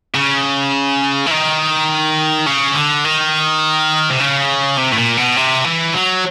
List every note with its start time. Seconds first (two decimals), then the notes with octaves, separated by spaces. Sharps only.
0.14 C#3
1.26 E3
1.31 D#3
2.46 C#3
2.75 D3
3.05 D#3
4.11 C3
4.20 C#3
4.78 C3
4.92 A2
4.98 A#2
5.17 B2
5.36 C3
5.64 E3
5.94 F#3